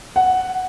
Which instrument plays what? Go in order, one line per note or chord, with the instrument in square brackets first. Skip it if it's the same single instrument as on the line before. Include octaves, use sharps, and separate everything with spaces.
[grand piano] F#5